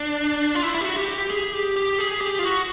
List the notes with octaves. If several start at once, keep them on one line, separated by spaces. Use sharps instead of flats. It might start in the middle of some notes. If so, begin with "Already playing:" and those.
Already playing: D4
F4
E4
E4
G4
F#4
G4
G4
G#4
G4
G4
G#4
G4
F4
F#4